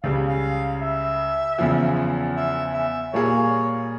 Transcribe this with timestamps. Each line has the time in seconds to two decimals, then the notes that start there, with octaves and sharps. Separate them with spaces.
0.03 C#2 C#3 G3 F5
0.28 F5
0.82 E5
1.58 E2 C#3 F3
2.36 E5
2.74 E5
3.13 A#2 G3 A#3 F4 G#4 C#5